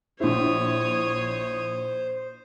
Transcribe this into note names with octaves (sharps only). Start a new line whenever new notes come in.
A#1 E4 C5 C#5 D#6